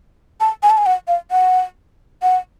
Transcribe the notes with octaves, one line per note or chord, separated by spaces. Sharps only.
A5
G#5
A5
G#5
F#5
F5
F#5
F#5